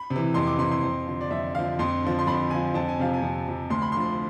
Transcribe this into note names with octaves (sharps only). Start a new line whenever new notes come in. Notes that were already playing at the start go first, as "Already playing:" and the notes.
Already playing: B5
C3
E3
F2 C6
D6
C3 E3 C6
C6
F2
D3 F3
D5
F2 E5
D3 F3 F5
F2 C6
D3 F3
C6
F2 B5
D3 F3 G#5
F2 A5
G#5
C3 F3 F5
G#5
F2
C3 F3
D2 C6
B5
D3 F3 C6